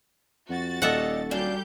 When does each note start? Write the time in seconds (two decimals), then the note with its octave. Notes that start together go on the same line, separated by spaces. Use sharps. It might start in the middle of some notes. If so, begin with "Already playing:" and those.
0.49 F2 F#4 A6
0.82 D#1 A#2 G4 A4 D#5 E5 F#5
1.31 F#2 G3 D4 G4 F5 G6